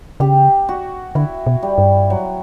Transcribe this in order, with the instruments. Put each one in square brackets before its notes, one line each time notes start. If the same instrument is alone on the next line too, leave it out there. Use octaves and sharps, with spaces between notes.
[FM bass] C#3 [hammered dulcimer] G4
[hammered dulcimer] F#4
[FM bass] D3 [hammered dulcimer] E4
[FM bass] B2
[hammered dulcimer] G3
[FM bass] G2
[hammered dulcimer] F#3